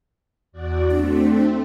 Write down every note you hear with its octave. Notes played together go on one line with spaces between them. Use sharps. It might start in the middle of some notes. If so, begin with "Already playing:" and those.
E2 F#4 D5
A3 C4 D4